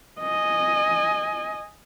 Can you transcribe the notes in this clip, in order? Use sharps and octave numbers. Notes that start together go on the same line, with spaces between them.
D#5 G#5